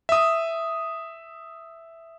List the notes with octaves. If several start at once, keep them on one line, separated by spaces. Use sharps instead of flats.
E5 D#6